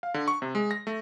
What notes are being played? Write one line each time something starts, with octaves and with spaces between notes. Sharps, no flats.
F5
D3
C#6
C3
G#3
A#6
A3